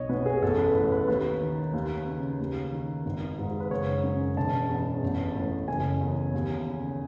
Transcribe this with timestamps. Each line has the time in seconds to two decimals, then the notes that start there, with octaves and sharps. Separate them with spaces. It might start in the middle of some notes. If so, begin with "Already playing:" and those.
Already playing: B1 C#5 D#5
0.09 B2 B4
0.26 G#4
0.42 A1 A4
0.59 B4
0.75 A2 B4
0.92 B4
1.08 D#2 B4
1.42 D#3
1.73 D#2
2.07 C#3
2.40 D#2
2.73 D#3
3.06 G#1
3.39 G#2
3.60 B4
3.70 F#1 C#5
4.03 F#2
4.37 E1 A5
4.70 E2
5.03 A1
5.36 A2
5.67 F#1 G#5
6.01 E2
6.33 D#2
6.66 C#3